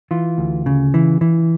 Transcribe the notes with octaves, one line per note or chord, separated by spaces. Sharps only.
E3 F4
D2
C#3
E3
E3